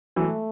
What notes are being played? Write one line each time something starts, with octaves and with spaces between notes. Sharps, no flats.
E3 F#3 A3